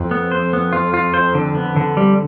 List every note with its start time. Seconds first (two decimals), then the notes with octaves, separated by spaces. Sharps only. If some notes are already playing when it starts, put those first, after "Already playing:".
Already playing: F2
0.11 B3
0.32 C5
0.53 B3
0.73 F4
0.94 F4
1.14 C5
1.35 D3
1.55 B3
1.76 D3
1.97 G3